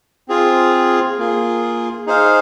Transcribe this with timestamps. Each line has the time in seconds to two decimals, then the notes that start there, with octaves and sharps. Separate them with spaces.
0.28 C4 F4 G#4
1.18 A#3 F4 G#4
2.06 D#4 G#4 C5 F5